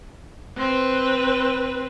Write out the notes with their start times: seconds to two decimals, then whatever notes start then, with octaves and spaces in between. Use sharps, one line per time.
0.57 C4 B4